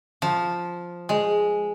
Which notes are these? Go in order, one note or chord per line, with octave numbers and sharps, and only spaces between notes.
F3
G#3